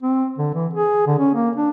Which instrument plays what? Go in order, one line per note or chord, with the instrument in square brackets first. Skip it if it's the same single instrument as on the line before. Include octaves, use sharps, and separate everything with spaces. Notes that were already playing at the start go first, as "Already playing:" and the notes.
[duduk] C4
D3
E3
G#4
D3
C#4
A#3
D4